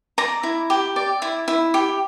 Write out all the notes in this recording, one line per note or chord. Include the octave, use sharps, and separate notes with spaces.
D5 A#5
E4
G4
D5
E4
E4
G4